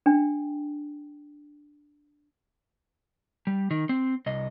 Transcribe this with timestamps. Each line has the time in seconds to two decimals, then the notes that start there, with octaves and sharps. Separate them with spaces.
0.06 D4 G5
3.47 G3
3.71 D#3
3.89 C4
4.26 C2 D#5